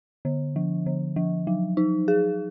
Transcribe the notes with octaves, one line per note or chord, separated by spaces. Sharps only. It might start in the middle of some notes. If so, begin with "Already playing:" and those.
D3
F3
D3
F3
F#3
D#4
G#4